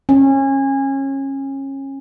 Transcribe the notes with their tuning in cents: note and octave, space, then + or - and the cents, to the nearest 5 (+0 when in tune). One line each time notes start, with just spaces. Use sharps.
C#4 -25